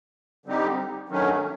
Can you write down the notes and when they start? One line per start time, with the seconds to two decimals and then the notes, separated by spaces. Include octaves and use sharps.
0.46 D3 G3 C4 D#4 G4
1.09 G2 D#3 F#3 A3 C#4